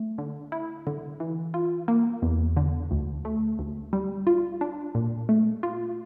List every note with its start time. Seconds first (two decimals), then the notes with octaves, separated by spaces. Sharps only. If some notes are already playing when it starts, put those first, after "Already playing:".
Already playing: A3
0.18 D3
0.52 E4
0.87 D3
1.20 E3
1.54 F4
1.88 A#3
2.22 E2
2.57 D3
2.91 D2
3.25 A3
3.59 D2
3.93 G3
4.27 F4
4.61 D4
4.95 A#2
5.29 A3
5.63 F4